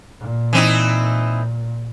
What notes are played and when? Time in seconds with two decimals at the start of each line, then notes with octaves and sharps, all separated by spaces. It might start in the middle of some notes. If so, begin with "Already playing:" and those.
0.21 A#2
0.53 E3 C4 D#4